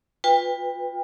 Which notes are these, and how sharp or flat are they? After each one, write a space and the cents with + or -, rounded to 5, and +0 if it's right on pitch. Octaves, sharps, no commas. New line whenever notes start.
F4 +25 B4 +0 G5 +35